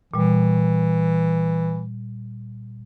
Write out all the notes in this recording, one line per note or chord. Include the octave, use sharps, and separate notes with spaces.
A#2 E3 G3